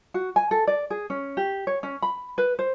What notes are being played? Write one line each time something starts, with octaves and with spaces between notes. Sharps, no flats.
F#4
G#5
A4
D5
G#4
C#4
G4
C#5
C#4
B5
B4
C5